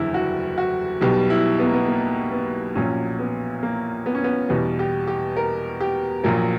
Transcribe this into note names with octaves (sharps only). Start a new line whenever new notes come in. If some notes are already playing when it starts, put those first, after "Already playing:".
Already playing: F#1 E2 D3 G3 E4 G4
F#4
F#4
B1 B2 G3 G4
E4
B3
A#3
B3
A#3
B3
A#1 A#2 F#3 C#4
B3
A#3
B3
C#4
B3
E2 B2 G3 B3
G4
G4
A#4
G4
A#1 A#2 F#3 A#4